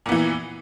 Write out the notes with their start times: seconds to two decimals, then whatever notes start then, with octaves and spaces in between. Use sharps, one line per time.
0.06 A#2
0.09 B3
0.12 E3